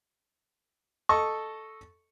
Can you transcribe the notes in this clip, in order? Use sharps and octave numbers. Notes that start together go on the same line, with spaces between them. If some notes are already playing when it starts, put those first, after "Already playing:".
A4 D#5 C#6